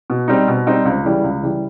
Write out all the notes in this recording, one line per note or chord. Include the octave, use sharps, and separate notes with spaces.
B2
G3 C4 D#4
B2
G3 C4 D#4
C#2
C#3 E3 G3
C#2
C#3 E3 G3